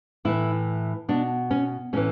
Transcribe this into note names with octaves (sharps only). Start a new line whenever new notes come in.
A2 E3 E4
B2 D4
C#4
A2 E3 C#4